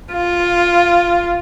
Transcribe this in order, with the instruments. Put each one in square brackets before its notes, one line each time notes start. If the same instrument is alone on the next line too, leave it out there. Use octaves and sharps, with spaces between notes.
[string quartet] F4